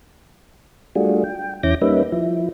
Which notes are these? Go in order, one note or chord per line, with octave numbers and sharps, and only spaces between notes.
G3 A3 D4 F4 F#4 G#4
G5
E2 C#4 E4 D6 G6 A#6
G3 A#3 C#4 D#4 B4 E5
F3 E4